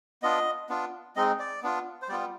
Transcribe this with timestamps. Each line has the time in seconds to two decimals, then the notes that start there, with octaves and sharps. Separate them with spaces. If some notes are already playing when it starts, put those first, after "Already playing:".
0.22 B3 D4 F4 D#5
0.69 B3 D4 F4
1.16 G#3 C4 D#4 D#5
1.39 D5
1.63 B3 D4 F4
2.02 C5
2.09 G3 B3 F4 D5